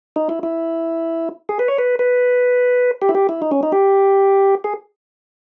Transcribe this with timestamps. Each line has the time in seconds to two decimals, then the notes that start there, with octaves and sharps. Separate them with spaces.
0.16 D#4
0.29 E4
0.43 E4
1.49 G#4
1.59 B4
1.68 C#5
1.78 B4
1.99 B4
3.02 G4
3.09 E4
3.15 G4
3.29 E4
3.42 D#4
3.52 C#4
3.63 D#4
3.72 G4
4.64 G#4